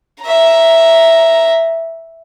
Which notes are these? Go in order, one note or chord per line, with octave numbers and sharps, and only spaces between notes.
E5 A#5